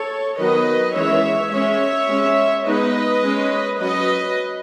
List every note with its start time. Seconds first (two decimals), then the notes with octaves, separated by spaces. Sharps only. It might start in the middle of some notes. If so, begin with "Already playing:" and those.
Already playing: A4 C#5
0.38 D#3 F#3 B3 B4 D#5
0.95 E3 G#3 C#4 C#5 E5
1.52 G#3 C#4 C#5 E5
2.09 G#3 C#4
2.66 G#3 B3 D#4 B4 D#5
3.23 G#3 C#4
3.80 F#3 C#4 B4 D#5